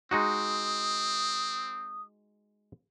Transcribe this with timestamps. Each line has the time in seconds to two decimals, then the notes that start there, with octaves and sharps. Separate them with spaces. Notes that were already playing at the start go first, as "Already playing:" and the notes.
0.11 G#3 C4 D#4 F#4 D#6